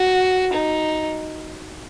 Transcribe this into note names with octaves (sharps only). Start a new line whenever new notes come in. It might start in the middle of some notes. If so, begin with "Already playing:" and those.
Already playing: F#4
D#4